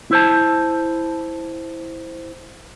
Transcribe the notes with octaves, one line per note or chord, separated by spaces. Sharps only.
E4 C5 A5